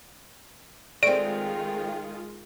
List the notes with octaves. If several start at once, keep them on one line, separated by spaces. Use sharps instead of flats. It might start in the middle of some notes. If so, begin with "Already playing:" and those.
D#3 G#3 A3 C4 F4 D5 D7